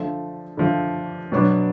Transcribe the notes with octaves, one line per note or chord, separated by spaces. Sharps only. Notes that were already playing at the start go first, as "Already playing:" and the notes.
Already playing: D3 F3 A3
D3 F3 A3
B2 F#3 B3 D4